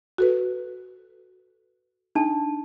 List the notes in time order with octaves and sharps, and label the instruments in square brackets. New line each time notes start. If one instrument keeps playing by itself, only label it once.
[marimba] F#4 A4 B4
[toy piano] D4 A5 [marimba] D#4